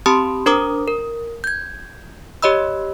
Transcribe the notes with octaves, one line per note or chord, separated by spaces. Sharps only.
C4 G4 A5 B5 C6 D#6
D4 A#4 C5 A#5 D6 D#6
A#4
G6 G#6
G4 C#5 D#5 B5 E6